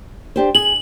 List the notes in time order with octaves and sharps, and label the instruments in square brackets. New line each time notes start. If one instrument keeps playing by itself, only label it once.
[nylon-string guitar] D4 G4 C5
[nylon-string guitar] G#4 [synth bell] F#7